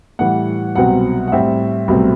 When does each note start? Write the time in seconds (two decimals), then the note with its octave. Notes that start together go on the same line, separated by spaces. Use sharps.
0.19 A2 E3 G3 F#5
0.75 C2 B2 F#3 C4 F#5
1.27 F#5
1.32 A2 G3 C4 E5
1.88 C2 B2 F#3 A3 C4